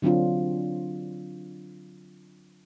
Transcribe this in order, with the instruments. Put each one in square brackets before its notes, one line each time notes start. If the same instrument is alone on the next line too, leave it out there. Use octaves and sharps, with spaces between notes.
[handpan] D3 F#3 C4 D4 F4